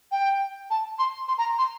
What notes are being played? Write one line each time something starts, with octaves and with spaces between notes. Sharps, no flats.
G5
A5
C6
C6
A#5
C6